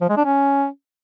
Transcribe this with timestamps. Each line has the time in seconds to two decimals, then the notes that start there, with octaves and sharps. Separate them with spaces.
0.01 F3
0.09 G#3
0.17 D4
0.25 C#4